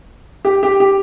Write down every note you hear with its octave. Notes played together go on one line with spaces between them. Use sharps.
G4
G4
G4